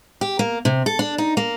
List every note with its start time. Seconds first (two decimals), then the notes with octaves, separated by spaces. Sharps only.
0.21 G4
0.39 A#3
0.65 C3
0.86 A4
0.99 D4
1.18 D#4
1.37 A#3